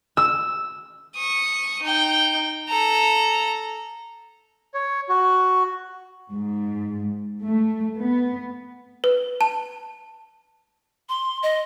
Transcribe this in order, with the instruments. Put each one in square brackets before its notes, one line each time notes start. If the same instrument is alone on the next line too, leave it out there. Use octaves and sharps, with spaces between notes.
[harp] E6
[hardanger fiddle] C#6 D#6
D#4 G5
A4 A#5
[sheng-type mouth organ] C#5
F#4
[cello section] G#2
A3
B3
[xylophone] B4
A5
[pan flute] C6
D#5